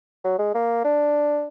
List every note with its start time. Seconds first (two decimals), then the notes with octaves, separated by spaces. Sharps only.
0.24 F#3
0.39 G#3
0.54 A#3
0.84 D4